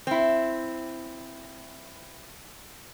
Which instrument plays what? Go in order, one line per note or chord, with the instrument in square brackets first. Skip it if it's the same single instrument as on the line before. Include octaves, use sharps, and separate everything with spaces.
[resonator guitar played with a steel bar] C4 E4